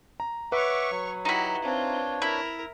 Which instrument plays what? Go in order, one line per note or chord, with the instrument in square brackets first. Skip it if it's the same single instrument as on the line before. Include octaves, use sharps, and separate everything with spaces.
[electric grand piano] A#5
[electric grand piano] B4 [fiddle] C#5 C#6 [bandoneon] E5 F#5 D6
[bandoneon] F#3
[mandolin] D#4 E4 [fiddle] F#4 G4
[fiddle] C4 F4 [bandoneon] D4 C#5
[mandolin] E4 [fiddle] A#4